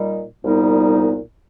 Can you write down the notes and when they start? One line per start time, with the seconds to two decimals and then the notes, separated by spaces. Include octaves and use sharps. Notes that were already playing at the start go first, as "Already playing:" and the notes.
Already playing: A#2 G3 D#4
0.43 C2 A#2 G3 B3 D#4